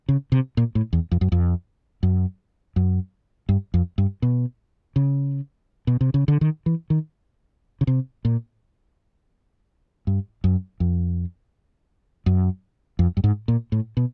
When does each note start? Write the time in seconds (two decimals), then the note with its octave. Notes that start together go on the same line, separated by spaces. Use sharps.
0.09 C#3
0.32 C3
0.57 A#2
0.75 A2
0.93 E2
1.11 F2
1.21 F#2
1.32 F2
2.03 F#2
2.76 F#2
3.49 G2
3.74 F2
3.98 G2
4.22 B2
4.96 C#3
5.87 B2
6.01 C3
6.14 C#3
6.28 D3
6.41 D#3
6.66 E3
6.90 D#3
7.81 C#3
7.87 C3
8.25 A#2
10.07 G2
10.44 F#2
10.80 F2
12.26 F#2
12.99 F2
13.17 G2
13.24 G#2
13.48 A#2
13.72 A2
13.97 B2